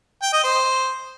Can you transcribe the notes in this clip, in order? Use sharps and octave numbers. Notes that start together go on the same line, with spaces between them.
G5
D#5
C5